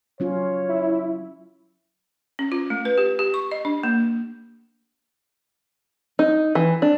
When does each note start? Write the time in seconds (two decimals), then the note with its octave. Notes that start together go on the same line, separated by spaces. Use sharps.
0.20 F#3 C#4 F4 C#5
0.69 E4
2.39 C#4
2.52 F4
2.70 A3
2.85 B4
2.98 G4
3.19 G4
3.34 C#6
3.51 D#5
3.65 D4
3.83 A#3
6.19 D#4
6.55 E3
6.82 D4